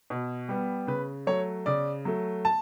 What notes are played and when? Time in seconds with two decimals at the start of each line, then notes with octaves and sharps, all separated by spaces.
0.10 B2
0.49 G3 B3
0.87 C#3 B4
1.27 F#3 A3 C#5
1.66 C#3 D5
2.05 F#3 A3
2.45 A5